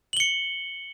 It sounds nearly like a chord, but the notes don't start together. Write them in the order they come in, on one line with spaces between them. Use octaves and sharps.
F#7 G7 C#7